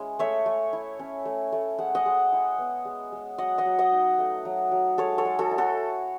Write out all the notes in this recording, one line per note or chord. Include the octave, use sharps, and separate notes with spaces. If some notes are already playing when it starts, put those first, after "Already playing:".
Already playing: G#3 C#4 E4
A3 C#5 E5
A3
E4
C#4
A3
A3
G#3 F#5
D#5 F#5
G#3
E4
B3
G#3
G#3
F#3 D#5 F#5
D#5 F#5
F#3
D#5 F#5
D#4
A3
F#3
F#3
G#3 A4 C#5
A4 C#5
G#3
F#4 A4
E4
F#4 A4